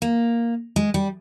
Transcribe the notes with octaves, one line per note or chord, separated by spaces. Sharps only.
A#3
G#3
G3